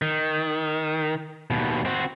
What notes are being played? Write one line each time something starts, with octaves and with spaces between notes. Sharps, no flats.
D#3
D#2 B2
C4 F#4